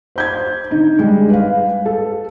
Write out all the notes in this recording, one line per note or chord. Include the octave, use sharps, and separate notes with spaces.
C5 G6 G#6
D3 D#4
G3 G#3
B4 F5
A4